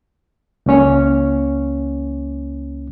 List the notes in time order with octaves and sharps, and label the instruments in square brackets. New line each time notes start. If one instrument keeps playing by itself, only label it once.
[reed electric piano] C#2 A#3 C#4 C#5